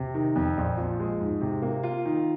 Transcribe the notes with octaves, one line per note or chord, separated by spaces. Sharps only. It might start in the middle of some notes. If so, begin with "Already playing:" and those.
Already playing: C3
D#3
F2
A#1
F3
G#3
G#2
C3
A#3
F4
D#3